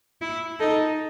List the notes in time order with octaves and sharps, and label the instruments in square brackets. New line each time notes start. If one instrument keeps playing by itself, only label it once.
[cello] E4
[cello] D#4 [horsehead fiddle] A4